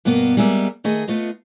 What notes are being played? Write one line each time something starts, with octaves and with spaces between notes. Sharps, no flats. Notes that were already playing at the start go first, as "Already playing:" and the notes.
G2 B2 A#3 B3
G3 G#3 A#3 B3 E4 E5
D#3 A3 G#4 D#5
A3 B3 F4 D#5